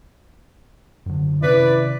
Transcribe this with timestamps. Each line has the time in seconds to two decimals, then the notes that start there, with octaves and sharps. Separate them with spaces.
1.06 F#2 D3
1.42 C3 D#3 C#4 E4 B4 D5